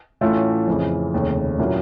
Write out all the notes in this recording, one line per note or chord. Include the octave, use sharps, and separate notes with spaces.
A2 E3 A3 C#4 F4
F2 C#3 E3
F1 D#2 C#3
A#2 F#3 A#3 C#4 E4